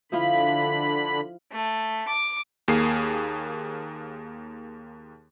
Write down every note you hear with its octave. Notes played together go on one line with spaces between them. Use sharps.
D3 F3 E4 F4 B5
A3
D6
D#2 A#3 G#4 C7